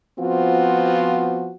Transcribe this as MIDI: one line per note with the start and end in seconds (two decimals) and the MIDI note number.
0.19 1.53 53
0.19 1.53 59
0.19 1.53 60
0.19 1.53 65
0.19 1.53 66